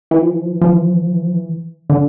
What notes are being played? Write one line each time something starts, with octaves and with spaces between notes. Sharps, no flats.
E3
F3
E3
F3
E3
F3
E3
F3
E3
F3
E3
F3
E3
D3